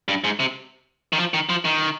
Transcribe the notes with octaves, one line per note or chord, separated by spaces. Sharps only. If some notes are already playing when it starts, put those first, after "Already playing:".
G2
G#2
C3
D#3
F3
D#3
F3
D#3